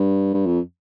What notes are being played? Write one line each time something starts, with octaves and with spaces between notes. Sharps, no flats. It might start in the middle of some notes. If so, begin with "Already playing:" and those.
Already playing: G2
G2
F2